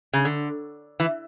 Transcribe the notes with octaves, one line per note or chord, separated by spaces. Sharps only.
C#3
D3
E3